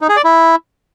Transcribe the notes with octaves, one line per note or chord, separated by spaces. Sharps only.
D#4
G#4
D5
E4